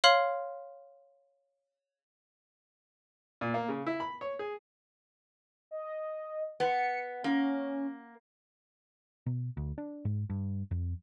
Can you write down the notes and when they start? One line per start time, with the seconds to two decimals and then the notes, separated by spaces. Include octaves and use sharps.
0.04 C#5 F5 C6 F6 C7 F#7
3.41 A#2
3.54 A#3
3.69 C#3
3.87 E4
4.00 B5
4.21 C#5
4.39 G#4
5.71 D#5
6.60 B3 C#7
7.24 A#3 C#4
9.26 B2
9.57 D2
9.78 D4
10.05 G#2
10.30 G2
10.71 F2